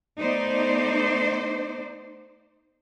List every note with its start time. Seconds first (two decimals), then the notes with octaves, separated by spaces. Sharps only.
0.19 A3 B3 D#4 C5 D5